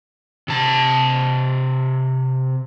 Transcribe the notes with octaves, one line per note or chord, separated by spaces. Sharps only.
C3 A5